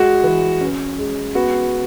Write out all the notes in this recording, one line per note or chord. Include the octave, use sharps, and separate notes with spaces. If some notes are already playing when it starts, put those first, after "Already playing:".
Already playing: G#3 F#4
E3
C#4
G#3
B3 F#4